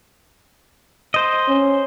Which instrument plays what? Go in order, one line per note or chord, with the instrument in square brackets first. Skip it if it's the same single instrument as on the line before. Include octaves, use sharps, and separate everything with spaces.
[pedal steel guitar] C5 D#5
[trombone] C#4